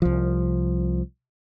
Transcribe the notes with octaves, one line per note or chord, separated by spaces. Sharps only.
C2 F3